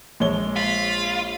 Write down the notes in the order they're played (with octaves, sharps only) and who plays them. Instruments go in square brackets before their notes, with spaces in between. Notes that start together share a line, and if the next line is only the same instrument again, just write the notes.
[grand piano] A#1 C#5 G7 [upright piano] G#3
[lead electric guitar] F4 [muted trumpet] B5